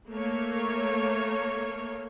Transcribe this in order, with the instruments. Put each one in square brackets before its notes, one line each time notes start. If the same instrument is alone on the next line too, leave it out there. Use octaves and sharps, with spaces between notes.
[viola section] A3 A#3 C#5